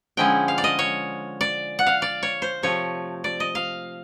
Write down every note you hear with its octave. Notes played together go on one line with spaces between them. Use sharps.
D3 F3 G#3 C#4 E4 G5
F5
D5
D#5
C#5
D5
F#5
F5
D5
C#5
C5
C3 F3 A3 C#5
D5
D#5
F5